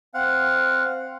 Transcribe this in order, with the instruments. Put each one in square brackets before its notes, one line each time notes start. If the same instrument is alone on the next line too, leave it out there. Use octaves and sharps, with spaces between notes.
[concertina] C4 F5 F#5